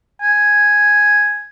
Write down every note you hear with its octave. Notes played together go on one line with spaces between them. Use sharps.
G#5